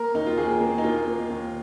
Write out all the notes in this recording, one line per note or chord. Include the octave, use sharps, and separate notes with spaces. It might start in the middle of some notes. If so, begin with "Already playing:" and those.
Already playing: A#3 A#4
D#2 D#4
F4
D#2 G#4
A#3
D#4
A#3 F4
A#3
D#2